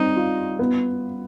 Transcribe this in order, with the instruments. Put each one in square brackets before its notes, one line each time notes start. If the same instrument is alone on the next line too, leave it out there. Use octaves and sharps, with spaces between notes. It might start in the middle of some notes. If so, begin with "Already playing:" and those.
Already playing: [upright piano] G3 C4 [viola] D#4
[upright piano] F4
B3